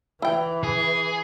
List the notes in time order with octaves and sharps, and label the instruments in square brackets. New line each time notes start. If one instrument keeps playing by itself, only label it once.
[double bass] E3 [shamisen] E4 G5
[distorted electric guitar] G#4